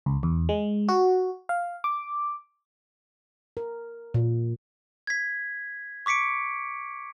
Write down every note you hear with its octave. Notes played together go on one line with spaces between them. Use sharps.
C#2
E2
G#3
F#4
F5
D6
A#4
A#2
G#6 B6
C#6 D6 B6 C#7 D7